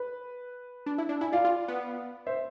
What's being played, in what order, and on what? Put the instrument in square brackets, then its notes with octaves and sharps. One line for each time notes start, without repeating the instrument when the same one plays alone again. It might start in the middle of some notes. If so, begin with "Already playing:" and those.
Already playing: [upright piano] B4
[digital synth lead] D4
E4
D4
[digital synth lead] E4 [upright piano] G#5
[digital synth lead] F4 [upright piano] D5 F5
[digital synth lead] F4
B3
[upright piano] C5 E5